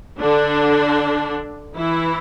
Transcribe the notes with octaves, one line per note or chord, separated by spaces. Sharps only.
D3 D4
E3 E4